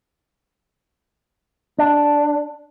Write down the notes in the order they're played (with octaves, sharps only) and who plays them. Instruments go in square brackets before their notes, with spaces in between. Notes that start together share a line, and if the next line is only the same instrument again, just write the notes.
[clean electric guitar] D4